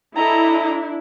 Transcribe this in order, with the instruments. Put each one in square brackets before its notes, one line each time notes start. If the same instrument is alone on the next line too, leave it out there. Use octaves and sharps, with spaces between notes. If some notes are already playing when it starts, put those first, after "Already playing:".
[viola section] D4 E4 [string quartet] A4 D#5 A#5